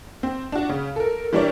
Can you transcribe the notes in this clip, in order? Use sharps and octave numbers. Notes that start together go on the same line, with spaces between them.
C4
D4 F#4
C#3
A4 A#4
E3 G3 D4 A#4 C#5 D5